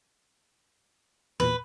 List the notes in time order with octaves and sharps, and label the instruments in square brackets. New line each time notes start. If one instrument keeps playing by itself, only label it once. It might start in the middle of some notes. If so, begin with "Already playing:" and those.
[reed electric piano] E2 A#2 [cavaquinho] B4